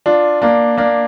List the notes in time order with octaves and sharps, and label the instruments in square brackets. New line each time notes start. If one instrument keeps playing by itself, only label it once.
[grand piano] D4 F4
A#3 D4
A#3 D4